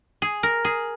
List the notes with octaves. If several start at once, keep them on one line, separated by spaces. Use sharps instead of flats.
G#4
A#4
G#4